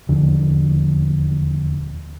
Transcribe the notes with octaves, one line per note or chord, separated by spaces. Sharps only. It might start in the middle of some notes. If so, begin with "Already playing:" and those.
D#1 E2 D3 F3